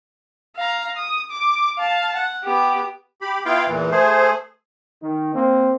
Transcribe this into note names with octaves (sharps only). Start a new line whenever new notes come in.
F5 A#5
D#6
D6
F5 A5
F#5
B3 G4
G4 B5
B3 E4 F4 F5 G5
E2 A#2 E3
A3 G#4 C5
D#3
A#3 C4